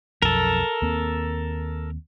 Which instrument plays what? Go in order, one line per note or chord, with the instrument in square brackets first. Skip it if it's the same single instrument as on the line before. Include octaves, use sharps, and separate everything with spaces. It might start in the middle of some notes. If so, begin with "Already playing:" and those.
[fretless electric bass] B1 F2 [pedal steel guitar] A4 A#4
[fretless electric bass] D#2 A#3 C4